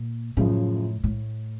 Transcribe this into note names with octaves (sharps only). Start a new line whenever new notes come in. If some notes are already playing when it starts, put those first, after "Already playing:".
Already playing: A#2
F#2 A2 C#3 F3
A2